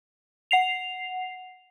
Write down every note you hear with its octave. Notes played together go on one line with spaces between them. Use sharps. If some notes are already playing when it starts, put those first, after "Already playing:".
F#5 C7 F7